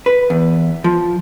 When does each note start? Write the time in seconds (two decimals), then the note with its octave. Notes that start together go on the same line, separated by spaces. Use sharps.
0.06 B4
0.30 E2
0.84 F3